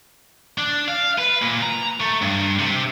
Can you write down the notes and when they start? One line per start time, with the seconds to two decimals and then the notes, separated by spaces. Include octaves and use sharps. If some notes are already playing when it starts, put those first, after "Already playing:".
0.58 D4
0.88 F5
1.19 B4
1.42 A#2
1.63 A#5
2.00 A3
2.22 G2
2.58 C3